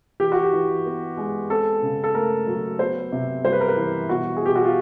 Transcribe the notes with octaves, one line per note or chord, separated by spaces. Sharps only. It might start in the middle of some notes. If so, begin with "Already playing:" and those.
E3 G4
F#4
G4
E3
B3
G#3
C4 A4
C#3
A4
A3 A#4
F#3
B3 C5
C3
G3 C5
B4
A#4
B4
E3
B2 F#4
G#4
B2 G4
F#4
F4